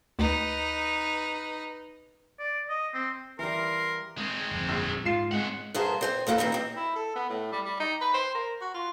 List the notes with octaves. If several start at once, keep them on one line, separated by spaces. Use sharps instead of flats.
D2 D#4 B4
D5
D#5
C4
E3 G3 A#4 F5 C6
G#3 C4
G1 F2
A#1
G#2 F4 C7 E7
G#3 C4 F#5 F#6
G2 B3 G#4 A#4 C5 A5
C4 C5 G#5
E2 A#3 E4 A4
E3 C4 D#4 E4
C4 D#5
E4
A4
B3
A2
G3
G3
D#4
B4
C5
A#4
F#4
F4